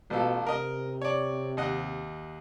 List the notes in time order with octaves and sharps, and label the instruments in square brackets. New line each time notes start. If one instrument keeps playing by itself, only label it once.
[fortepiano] A1 F4 A4 [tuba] B2
[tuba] C3 [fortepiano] A#4 D#5
[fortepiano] C#5 D5
D#2 D#5 F#5